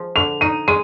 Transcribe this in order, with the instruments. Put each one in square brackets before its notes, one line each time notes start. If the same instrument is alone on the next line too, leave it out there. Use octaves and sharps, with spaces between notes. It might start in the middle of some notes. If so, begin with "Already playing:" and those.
Already playing: [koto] F3 G#3
[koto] D3 [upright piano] F7
[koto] D#4 [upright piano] D#7
[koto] G#3 [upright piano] D#7